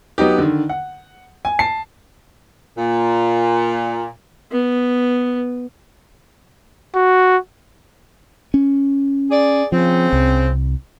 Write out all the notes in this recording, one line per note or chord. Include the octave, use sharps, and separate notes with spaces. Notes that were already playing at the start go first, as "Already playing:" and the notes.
F#3 B3 D#4 G4
D3 D#3
F#5
G#5
A5 C7
A#2
B3
F#4
C#4
G#4 D5
C#3 F3 C4
C2